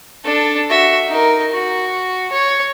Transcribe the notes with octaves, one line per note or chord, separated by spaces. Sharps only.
D4 A4
F#4 E5
D#4 A#4
F#4
C#5